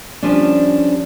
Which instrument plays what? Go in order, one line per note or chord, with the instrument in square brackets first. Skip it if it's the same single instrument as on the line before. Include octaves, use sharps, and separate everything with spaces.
[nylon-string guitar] F3 G3 C#4 D4